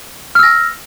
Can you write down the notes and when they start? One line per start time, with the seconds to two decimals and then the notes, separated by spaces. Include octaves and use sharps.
0.35 F6
0.39 E6
0.43 A#6